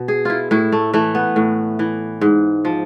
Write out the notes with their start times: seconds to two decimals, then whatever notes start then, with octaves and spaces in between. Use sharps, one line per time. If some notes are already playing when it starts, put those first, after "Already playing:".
Already playing: B2
0.08 G#4
0.25 E4 F4
0.51 A2 E4
0.72 A3
0.93 E3 A3
1.15 B3
1.36 A2
1.79 E3
2.21 G#2
2.65 F3